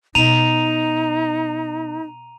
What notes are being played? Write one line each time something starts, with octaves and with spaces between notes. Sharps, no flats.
B2 D#4 A#5 D#7 F7